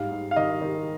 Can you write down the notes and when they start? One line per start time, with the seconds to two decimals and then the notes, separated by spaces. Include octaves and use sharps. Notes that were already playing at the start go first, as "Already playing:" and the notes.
Already playing: G#2 G3 F5
0.12 G#2
0.31 F5
0.36 D#3 D#5
0.61 D#3